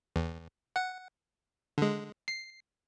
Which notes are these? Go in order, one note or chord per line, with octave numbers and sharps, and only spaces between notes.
E2
F#5
D3 G#3
C7